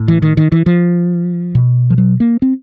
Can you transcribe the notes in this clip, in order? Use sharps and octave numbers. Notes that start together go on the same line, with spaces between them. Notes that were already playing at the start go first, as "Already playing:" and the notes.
Already playing: A2
E3
D#3
D#3
E3
F3
B2
F3
F#3
A#3
C4